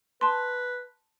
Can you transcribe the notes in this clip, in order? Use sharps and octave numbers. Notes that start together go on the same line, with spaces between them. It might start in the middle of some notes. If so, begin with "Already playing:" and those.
B4 A5 C6